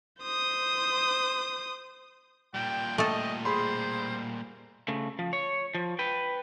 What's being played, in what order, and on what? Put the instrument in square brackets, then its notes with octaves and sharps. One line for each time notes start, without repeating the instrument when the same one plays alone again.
[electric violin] C5 D#6
[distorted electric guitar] A#2 G3 [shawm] G5
[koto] A3 A4 [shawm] D#5
[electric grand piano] G#4 B5 C6 [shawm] C5
[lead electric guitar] C#3 A3
F3
C#5
F3
B4 G5